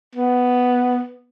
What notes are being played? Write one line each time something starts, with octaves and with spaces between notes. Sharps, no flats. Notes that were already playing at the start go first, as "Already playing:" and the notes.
B3